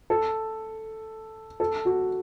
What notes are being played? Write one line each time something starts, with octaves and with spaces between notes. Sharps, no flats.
A4
A4
F#4